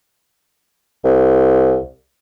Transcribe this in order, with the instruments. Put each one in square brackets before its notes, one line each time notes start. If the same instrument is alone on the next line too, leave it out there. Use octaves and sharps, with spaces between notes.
[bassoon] C2